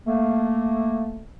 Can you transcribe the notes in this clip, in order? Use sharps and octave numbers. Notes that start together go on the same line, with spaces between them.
A3 A#3